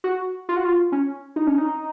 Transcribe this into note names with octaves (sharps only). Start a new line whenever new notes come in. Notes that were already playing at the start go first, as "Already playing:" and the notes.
F#4
F4
F#4
F4
C#4
D#4
C#4
D#4